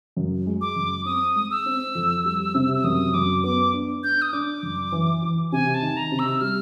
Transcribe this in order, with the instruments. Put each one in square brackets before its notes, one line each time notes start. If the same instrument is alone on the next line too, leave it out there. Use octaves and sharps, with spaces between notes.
[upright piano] F#2
G#3
[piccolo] D6
[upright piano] F#2
[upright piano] C4 [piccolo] D#6
[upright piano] G#3
[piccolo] E6
[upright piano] C4
F2
G3
C3
[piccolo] E6
[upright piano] F#2 [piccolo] D#6
[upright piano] F#2 [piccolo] D6
[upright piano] B3 [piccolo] D6
[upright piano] D4
[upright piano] D4 [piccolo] G6
[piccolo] D#6
[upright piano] D4 [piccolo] D6
[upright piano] F#2
E3
E3
[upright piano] C3 [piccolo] G#5
[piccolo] A5
[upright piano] D#3
[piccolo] A#5
[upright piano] C3
[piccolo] E6
[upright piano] G3 [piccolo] F6